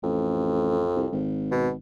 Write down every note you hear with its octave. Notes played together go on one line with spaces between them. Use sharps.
A1 F2
C2
G#1
B2